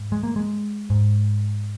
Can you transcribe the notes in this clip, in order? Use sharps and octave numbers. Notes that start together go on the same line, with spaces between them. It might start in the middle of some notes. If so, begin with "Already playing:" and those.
Already playing: G#2
G#3
A#3
G#3
G#2